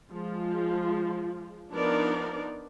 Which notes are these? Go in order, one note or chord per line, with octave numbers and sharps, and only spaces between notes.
F3 G#3 F4
F3 B3 D4 D#4 A#4 D5